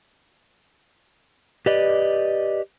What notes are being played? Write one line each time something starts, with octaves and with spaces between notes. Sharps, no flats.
G4 B4 D5 D#5